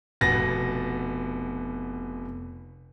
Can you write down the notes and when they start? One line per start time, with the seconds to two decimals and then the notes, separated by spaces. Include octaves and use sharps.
0.21 F1 B2 B3 A6 A#6